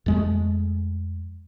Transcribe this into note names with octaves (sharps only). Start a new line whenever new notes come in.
F2 G#3 A3